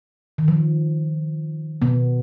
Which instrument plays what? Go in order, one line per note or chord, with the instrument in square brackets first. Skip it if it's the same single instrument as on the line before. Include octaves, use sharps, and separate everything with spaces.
[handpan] D#3
F3
B2 B3